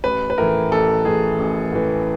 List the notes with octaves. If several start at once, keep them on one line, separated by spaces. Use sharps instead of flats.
A1 B4
B4
A2 E3 A#4
A1 A4
A2 E3 G#4
A1
A2 E3